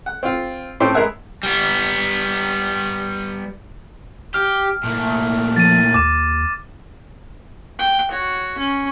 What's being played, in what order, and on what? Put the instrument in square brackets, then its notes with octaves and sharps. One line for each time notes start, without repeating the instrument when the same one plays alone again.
[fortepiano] F#5
C4 F4
A2 C4 C#4 A4 C6
G#3 B3 G#4 A#4 E5 F#5
[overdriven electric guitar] G3 B3
[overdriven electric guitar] G4 [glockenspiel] F6
[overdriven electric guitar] A#2 A3
[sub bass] F3 [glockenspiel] A6 D#7
[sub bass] D#2 [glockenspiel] D6 E7
[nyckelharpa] G5
F#4 C#5
C#4